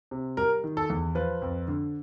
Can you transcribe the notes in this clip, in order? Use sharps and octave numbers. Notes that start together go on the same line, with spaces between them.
C3
G3 A#4
D#3
A4
E2
F3 B4
F2
D3